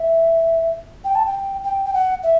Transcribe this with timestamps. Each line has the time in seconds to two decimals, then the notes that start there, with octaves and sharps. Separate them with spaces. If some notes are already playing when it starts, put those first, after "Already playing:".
Already playing: E5
1.04 G5
1.15 A5
1.25 G5
1.64 G5
1.85 G5
1.94 F#5
2.24 E5